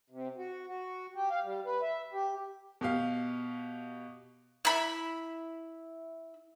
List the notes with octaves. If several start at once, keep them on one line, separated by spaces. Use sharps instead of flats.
C3
F#4
F#4
G4
F5
G3
B4
E5
G4
B2 G4 F5
E4 B5